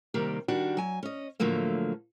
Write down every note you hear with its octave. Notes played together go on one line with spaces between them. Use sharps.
C3 D#3 G3 A#3 G4
D#3 G3 D4 F#4
F#3 G#5
C#4 D#5
A2 D3 F3 F#3 A3 A#3